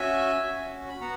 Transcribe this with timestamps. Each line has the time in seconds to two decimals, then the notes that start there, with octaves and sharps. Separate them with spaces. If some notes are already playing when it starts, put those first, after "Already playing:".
Already playing: C#4 F#4 E5 G#5
0.43 C#4 F#4
0.89 B5
1.01 B3 F#4 F#5 A#5